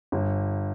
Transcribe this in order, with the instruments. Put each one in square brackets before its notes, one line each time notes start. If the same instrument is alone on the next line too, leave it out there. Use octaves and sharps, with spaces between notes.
[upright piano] G1